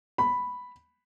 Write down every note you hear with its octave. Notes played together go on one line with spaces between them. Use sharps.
B5